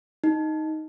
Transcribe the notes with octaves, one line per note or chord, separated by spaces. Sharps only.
D#4